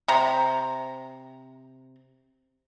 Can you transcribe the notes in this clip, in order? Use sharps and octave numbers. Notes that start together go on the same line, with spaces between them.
C3 A#5